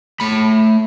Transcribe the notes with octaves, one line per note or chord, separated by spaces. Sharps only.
A3 B5